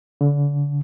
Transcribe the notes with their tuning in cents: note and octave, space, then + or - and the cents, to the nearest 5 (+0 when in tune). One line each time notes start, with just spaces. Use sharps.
D3 -35